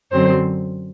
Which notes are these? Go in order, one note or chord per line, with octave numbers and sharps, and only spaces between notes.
F#2 D3 F#3 C4 C5